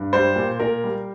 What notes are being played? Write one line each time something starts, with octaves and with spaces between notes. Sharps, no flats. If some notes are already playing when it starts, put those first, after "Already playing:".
Already playing: G2
G3 C5
A#2
A#2 A#4
G3